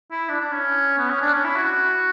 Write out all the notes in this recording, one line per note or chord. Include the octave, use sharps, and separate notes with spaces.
E4
D4
D4
C#4
B3
C#4
D4
C#4
E4
F#4